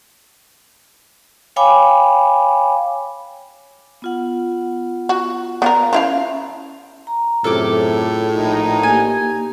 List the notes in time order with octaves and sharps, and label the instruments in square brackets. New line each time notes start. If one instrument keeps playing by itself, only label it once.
[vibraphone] C#5 F5 G5 G#5 B5 D6
B3 F4 F#5
[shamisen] F#4
[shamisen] B3 F4 A#4 [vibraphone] D5
[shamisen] F3 E4 F5 [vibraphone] C#4
[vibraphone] A#5
[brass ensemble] F#2 C3 [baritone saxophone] A2 [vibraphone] F4 G#4 [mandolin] A4 D6
[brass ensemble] A#1 D#4
[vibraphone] A#3 G4 [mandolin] G#5